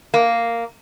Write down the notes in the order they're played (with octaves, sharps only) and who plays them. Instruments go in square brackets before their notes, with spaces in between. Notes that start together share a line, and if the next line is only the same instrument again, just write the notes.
[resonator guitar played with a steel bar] A#3